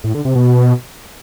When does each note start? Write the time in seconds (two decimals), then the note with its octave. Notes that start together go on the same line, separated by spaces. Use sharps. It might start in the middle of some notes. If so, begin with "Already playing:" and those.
0.04 A2
0.14 D3
0.25 C3
0.35 B2